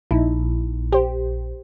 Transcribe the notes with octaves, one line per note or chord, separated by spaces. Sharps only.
A#1 D#4 E4
G4 C5